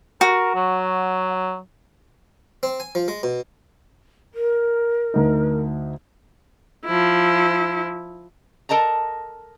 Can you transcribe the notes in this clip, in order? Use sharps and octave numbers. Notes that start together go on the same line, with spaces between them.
F#4 A#4
F#3
C4
G#5
F3
G#3
B2
A#4
D2 D#4
F3 E4
A4 A#4 D#5 A5 A#5